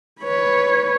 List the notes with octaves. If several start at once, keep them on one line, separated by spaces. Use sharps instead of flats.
B4 C#5